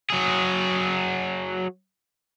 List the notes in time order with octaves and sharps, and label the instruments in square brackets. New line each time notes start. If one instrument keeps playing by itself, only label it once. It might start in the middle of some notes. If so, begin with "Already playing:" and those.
[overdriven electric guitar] F#3 G#4